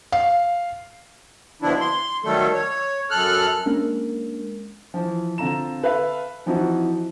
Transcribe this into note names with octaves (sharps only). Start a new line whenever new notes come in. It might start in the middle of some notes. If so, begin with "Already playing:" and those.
F5
B2 D3 F3 D4 E4
C6
D#3 F#3 G3 A3 A4
C#5
F#2 A4 F6 F#6
G#3 A#3 C#4 D4 A#4
E3 F3
D3 C4 F4 A4 A#5 E7
A4 B4 E5 F5 B5
E3 F3 C4 D#4 E4 F#4